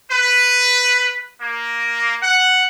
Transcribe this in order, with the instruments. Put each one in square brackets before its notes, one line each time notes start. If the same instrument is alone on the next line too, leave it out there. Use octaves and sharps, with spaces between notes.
[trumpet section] B4
A#3
F#5